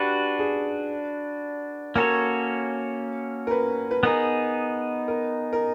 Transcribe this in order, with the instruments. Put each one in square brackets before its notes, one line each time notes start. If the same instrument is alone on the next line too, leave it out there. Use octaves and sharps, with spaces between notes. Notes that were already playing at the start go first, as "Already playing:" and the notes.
Already playing: [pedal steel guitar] D4 F#4 B4 [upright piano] G4
[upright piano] G#4
[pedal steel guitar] A#3 C#4 F#4 A4 C#5 [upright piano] A#4
[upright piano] A#4
B4
B4
[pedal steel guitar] B3 D#4 G#4 [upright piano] A#4
[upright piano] A#4
A#4